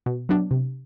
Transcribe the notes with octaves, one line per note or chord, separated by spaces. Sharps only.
B2
F#3 B3 D4
C3